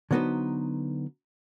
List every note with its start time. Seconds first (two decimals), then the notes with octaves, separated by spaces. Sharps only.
0.11 D3 F#3 B3 D#4 B4 C5